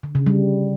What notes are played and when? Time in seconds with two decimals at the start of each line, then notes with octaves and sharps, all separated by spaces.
0.03 D3
0.15 C#3
0.27 G3